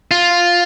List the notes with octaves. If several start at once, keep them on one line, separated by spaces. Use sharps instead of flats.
F4